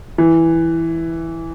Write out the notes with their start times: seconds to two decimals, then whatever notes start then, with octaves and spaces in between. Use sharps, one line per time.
0.18 E3